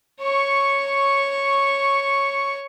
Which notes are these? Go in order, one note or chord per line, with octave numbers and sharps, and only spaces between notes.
C#5 C#6